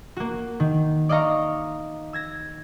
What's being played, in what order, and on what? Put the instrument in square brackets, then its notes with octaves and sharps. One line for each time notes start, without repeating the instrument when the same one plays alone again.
[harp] A#3 F#4
D#3
D5 D#5 F5 A#5 C#6
E6 G#6 A#6